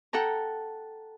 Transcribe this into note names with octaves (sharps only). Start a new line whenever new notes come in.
A4 F#5 G5 A#5